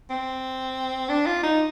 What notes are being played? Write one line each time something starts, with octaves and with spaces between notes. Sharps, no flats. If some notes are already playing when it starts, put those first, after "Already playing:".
C4
D4
F4
D#4